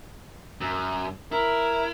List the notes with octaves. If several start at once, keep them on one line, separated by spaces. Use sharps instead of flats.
F#2
E4 A#4